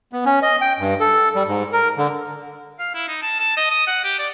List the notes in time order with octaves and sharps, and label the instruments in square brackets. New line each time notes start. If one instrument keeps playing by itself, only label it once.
[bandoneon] B3
C#4
D#5
G5
G2
A4
G3
G#2
A#4
D3
[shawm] F5
E4
D#4
A5
A5
D#5
D#6
F#5
G4
D5